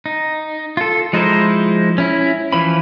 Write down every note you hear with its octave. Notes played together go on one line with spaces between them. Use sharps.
D#4
F4 A4
F3 G#3 D#4 E4 C5
C#4 E4
E3 F3 C#4 B5